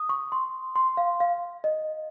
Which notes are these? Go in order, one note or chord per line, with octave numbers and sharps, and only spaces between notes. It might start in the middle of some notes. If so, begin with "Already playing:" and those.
Already playing: D#6
C#6
C6
C6
F5
F5
D#5